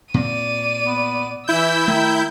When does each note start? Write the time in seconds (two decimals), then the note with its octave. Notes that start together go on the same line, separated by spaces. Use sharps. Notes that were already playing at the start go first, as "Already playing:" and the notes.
0.14 A#2 C4 D5 D#7
0.85 B3
1.48 E3 E4 E6 G6
1.88 D#3 A3